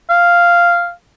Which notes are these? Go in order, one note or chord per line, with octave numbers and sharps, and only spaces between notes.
F5